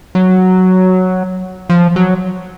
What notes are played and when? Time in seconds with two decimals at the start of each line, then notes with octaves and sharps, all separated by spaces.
0.15 F#3
1.69 F3
1.96 F#3